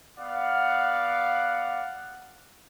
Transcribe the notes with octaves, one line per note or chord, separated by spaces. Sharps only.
B3 D5 F5 F#5